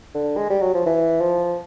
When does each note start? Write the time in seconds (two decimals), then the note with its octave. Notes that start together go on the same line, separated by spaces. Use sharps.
0.15 D3
0.37 G#3
0.50 G3
0.62 F#3
0.74 F3
0.86 E3
1.21 F3